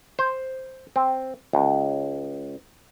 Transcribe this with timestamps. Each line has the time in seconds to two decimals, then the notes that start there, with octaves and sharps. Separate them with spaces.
0.19 C5
0.96 C4
1.53 C#2